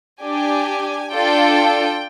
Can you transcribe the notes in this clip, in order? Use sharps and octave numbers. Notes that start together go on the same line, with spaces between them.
D4 G4 G#5
D4 F4 A4 G5